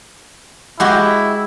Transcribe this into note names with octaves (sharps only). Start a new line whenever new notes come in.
G#3 E4 F#4 G4